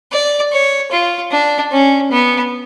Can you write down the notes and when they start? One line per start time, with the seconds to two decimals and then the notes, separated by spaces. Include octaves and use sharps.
0.12 D5
0.52 C#5
0.91 F4
1.32 D4
1.72 C#4
2.11 B3